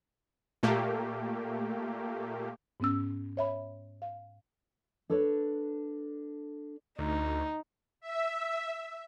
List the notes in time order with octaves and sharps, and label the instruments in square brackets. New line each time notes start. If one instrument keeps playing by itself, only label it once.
[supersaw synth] A#2 A3 A#3 G4
[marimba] G#2 B3 C#4 E6
C#5 E5 B5
F5
[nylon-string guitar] D4 A4 B4 C#5
[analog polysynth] D2 [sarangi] D#4
[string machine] E5